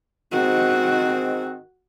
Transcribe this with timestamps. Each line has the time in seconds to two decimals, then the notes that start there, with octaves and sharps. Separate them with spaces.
0.32 G#2 D#3 C4 F#4